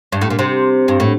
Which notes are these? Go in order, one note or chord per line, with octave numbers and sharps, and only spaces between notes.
G2
A2
A#2
C3
G2
A2